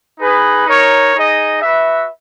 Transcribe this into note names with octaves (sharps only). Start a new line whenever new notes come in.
D#4 G#4 B4
D#4 A#4 C#5
D#4 G#4 D#5
F#4 B4 E5